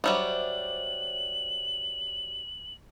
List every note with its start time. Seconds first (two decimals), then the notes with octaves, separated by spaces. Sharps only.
0.04 F#3 G3 D4 C5 E5 F#7